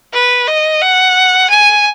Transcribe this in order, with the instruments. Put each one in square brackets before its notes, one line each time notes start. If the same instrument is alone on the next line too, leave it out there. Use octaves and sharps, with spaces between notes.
[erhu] B4
D#5
F#5
G#5